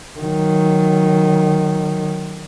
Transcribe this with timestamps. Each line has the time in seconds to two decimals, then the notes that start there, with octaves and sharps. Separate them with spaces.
0.20 D#3 F#3